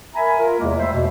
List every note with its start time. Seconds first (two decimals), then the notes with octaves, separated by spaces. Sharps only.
0.15 A#4 E5 G#5 A#5 B5
0.38 F4 A#4
0.59 E2 C3 G#3 A#3 E4
0.79 G3 A3 C5 E5
0.92 E2 B2